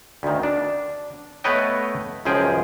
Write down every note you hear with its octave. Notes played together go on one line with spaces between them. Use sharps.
D2 D#3
D4
A3 B3 B4 C#5 D#5 G5
C#2 F#2 F3 G#4 G5